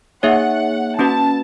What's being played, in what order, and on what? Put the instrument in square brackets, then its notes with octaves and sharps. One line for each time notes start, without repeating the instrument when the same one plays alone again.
[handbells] A#3 D#4 G#4 C#5 E5 [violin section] F#5
[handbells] A#3 C#4 F#4 B4 [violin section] A5